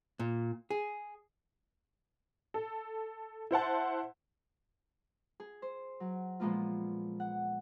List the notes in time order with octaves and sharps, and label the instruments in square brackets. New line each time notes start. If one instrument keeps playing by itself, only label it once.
[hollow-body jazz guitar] A#2
G#4
[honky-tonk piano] A4
E4 C5 F#5 A5
[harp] G#4
C5
F#3
A#2 F3 G#3 A#3 B3 F4
F#5